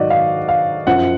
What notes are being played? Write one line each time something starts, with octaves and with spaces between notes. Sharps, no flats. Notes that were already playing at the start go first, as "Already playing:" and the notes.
Already playing: G#2 D#3 F#3 F#4 D5 D#5
F5
F5
F#2 F3 F#5